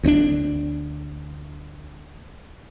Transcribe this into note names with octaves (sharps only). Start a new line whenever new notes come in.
D2 C4 D4